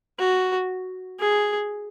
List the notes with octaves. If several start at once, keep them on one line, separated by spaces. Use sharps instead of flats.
F#4
G#4